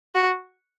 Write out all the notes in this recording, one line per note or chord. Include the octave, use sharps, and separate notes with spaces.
F#4